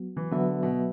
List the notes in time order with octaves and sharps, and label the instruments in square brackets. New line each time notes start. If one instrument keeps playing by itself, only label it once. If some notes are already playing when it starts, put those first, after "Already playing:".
Already playing: [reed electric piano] F#3 B3 F#4
[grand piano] E3
[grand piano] D3 [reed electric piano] F#3 B3 F#4 B4 E5
[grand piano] B2